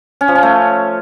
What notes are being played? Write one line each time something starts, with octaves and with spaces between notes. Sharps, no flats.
C#4
F3
C#4
A3